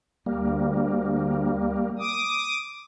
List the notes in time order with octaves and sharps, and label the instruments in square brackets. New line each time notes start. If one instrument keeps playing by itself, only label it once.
[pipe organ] D2 [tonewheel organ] G3 A#3
[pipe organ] D6 D#6